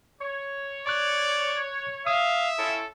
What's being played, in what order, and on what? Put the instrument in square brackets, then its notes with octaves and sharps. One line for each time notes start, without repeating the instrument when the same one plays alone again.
[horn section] C#5
[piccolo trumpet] D5 [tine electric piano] C#6 F#6
[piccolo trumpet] E5 [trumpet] F5 [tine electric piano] D#6
[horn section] C#4 E4 F4 [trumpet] A4